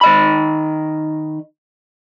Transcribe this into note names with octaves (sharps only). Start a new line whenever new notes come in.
D#3 D#5 B5